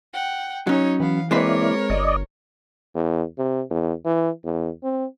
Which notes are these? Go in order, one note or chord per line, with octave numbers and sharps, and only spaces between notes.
F#5 G5
F#3 C#4 D#4 C#5
E3 B3 F5
G#3 A#3 C4 E4 A#4 B4 C#5 D5
G1 D5 D#5
E2
C3
E2
E3
E2
C4